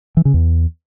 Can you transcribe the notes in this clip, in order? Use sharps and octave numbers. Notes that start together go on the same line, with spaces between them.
E3
C#3
E2